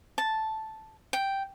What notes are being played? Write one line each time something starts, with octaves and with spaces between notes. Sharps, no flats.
A5
G5